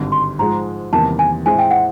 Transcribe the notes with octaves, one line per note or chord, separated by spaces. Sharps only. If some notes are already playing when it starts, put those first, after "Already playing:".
Already playing: G#1 G2 D3
C6
G#2 F3 G#3 A#5
E2 C3 D#3 G3 A#3 A5
G#5
A2 E3 G#3 C4 E4 G#5
G5
F#5